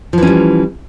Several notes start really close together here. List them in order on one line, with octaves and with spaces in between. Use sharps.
F3 E3 C#4 G3